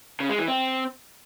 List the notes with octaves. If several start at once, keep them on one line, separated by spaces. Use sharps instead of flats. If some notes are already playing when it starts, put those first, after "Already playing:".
C#3
G#3
E3
C4